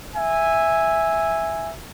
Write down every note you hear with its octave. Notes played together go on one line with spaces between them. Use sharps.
E5 G#5